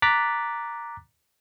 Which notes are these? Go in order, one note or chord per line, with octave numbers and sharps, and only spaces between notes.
A#5 D6 F#6 A6 B6